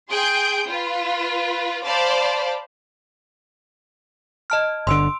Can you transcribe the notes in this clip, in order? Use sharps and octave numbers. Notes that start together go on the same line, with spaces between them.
G#4 G5 C6 G6 D7
F4 B4
C5 D5 F5 A5 B5 D6
D#5 A5 F6
G1 D3 C6 E6 D7